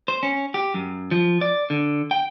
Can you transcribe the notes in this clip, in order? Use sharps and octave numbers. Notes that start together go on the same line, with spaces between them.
C5
C#4
G4
F#2
F3
D5
D3
G5